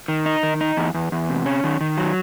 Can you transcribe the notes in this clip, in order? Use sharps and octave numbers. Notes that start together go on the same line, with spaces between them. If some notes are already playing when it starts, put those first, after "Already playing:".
D#3
D#4
D#3
D#4
E2
E2
E2
C3
C#4
D#3
D#3
F#3